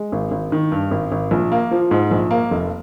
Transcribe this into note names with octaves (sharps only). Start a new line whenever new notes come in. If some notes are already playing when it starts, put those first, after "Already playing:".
Already playing: G#3
G#1
G#1
D#3
G2
G#1
G#1
A#1
A#3
F3
G#2
A#1
A#3
F1